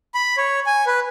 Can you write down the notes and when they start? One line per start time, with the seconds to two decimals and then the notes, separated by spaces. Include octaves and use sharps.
0.14 B5
0.37 C#5
0.66 G#5
0.86 B4